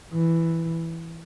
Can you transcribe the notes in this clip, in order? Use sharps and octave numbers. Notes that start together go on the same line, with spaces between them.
E3